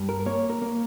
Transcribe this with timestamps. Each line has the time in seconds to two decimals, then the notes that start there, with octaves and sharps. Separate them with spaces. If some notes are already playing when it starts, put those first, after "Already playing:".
Already playing: G2
0.09 A#4
0.26 A#3 C#5
0.50 A#4
0.62 A#3